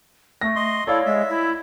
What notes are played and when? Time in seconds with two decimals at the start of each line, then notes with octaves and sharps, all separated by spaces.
0.41 A3 A#6
0.56 D#5 C6
0.87 E4 A4 C#5 D5 F5
1.06 G#3 E5
1.29 E4